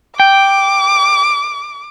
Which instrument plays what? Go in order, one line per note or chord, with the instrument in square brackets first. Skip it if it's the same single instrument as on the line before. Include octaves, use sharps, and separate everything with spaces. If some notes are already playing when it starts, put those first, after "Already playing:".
[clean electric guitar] G5 [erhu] D6